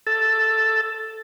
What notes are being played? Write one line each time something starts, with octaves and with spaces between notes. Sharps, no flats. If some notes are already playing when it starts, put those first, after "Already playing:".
A4